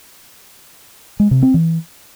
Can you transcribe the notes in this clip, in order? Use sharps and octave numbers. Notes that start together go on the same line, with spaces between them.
G#3
C3
C4
E3